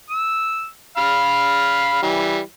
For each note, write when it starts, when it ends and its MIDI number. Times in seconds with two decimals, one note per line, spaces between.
0.10 0.66 88
0.97 2.01 77
0.97 2.01 83
0.97 2.01 89
2.03 2.39 52
2.03 2.39 55